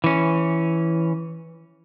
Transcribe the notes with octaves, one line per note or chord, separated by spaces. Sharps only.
E3 C#4